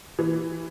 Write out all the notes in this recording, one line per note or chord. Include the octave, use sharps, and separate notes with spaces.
E3